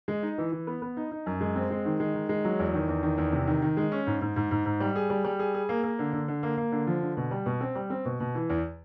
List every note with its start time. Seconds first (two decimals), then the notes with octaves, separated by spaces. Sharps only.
0.08 G#3
0.23 D#4
0.38 E3
0.52 E3
0.67 B3
0.82 B3
0.97 D#4
1.11 D#4
1.26 F#2
1.41 G#3
1.56 C4
1.71 G#3
1.85 D#3
2.00 G#3
2.14 D#3
2.29 G#3
2.44 F#3
2.59 E2
2.74 D#3
2.88 E2
3.03 D#3
3.18 E2
3.32 C3
3.47 D#3
3.62 D#3
3.77 G#3
3.92 C#4
4.07 G#2
4.21 G#2
4.36 G#2
4.51 G#2
4.65 G#2
4.80 G3
4.95 G#4
5.10 G3
5.24 G3
5.39 G#4
5.54 G#4
5.69 A#3
5.83 A#3
5.99 D3
6.13 D3
6.28 D3
6.43 A#3
6.57 A#3
6.72 D3
6.87 F3
7.02 D3
7.17 B2
7.31 G3
7.46 B2
7.61 C4
7.75 G3
7.90 C4
8.05 B2
8.20 B2
8.35 E3
8.50 E2